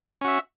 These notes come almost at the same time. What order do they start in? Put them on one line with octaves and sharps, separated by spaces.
C#4 F#4 E5